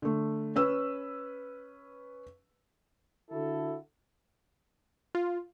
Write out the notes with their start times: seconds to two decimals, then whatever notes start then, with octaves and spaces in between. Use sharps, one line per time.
0.02 D3 A3
0.56 C#4 B4 E6
3.31 D3 E4 F#4 A4
5.15 F4